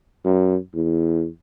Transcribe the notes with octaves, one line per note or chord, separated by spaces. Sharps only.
F#2
E2